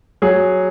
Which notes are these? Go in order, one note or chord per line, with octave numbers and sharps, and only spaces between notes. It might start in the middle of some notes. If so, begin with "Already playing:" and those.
F#3 G#4